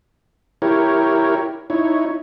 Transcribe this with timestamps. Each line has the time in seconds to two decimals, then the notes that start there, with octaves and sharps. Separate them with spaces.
0.62 E4 G4 A#4 C#5
1.70 D#4 E4 C#5